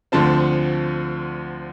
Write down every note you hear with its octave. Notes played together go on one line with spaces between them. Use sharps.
D2 D3 F3 C4 A5